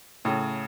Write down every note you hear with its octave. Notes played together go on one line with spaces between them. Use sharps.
A2 C#3